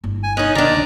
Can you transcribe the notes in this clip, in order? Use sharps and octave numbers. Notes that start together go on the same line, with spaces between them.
G1 E4
G#5
C#4 D#4 D#5 F#6
D#3 D4 D5 A#5
E1 C#2